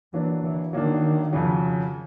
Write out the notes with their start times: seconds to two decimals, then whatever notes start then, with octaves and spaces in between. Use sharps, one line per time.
0.14 E3 F#3 A#3 D4
0.43 E3
0.73 D#3 F#3 A#3 D4
1.33 F2 C#3 F#3